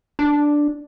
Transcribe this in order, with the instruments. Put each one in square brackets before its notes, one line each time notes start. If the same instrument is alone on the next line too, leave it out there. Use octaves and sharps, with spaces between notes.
[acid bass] D4